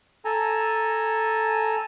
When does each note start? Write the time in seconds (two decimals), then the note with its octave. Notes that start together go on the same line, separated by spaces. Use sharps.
0.25 A4 G#5 A#5